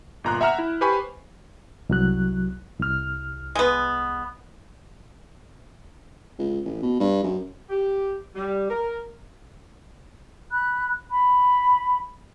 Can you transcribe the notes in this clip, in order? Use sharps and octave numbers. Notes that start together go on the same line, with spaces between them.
G1 A#2 A#5 C6 F#6
E5 F#5 A#5 F6 E7
E4
G4 B4 C5 G#5 B5 C#6
C2 F#3 F#6
C2 F6
G#3 B3
C#2
A1
B2
G2
F#2
G4
G3
A#4
B5 F#6
B5